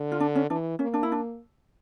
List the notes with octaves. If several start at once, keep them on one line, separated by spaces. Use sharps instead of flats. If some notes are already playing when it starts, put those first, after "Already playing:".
Already playing: D3
F4
D4
C#4
E3 D4
A#3 C#4
D4
E4
D4